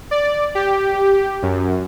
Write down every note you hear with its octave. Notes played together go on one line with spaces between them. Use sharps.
D5
G4
F#2